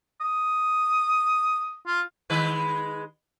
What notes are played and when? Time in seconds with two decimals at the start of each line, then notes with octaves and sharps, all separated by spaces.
0.21 D#6
1.87 F4
2.30 D#3 G#3 B4